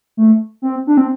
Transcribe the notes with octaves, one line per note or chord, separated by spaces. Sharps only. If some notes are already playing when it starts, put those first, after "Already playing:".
A3
C4
D4
C4